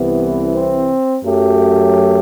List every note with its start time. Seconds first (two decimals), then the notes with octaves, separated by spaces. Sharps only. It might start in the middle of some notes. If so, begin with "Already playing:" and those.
Already playing: C2 C3 E3 B3
0.53 C4
1.24 F#2 F#3 A3 G4